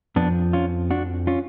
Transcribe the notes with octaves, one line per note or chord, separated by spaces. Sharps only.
F2 F3 B3 D4
C#4 F4
D4 F#4
C#4 F4